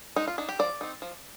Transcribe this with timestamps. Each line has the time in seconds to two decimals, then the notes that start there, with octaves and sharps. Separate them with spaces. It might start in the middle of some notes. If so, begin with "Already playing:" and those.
0.16 G#3 D#4
0.28 F4
0.38 D4 D#4
0.49 G4
0.59 F3 D5
0.81 C4 D#4
1.02 F3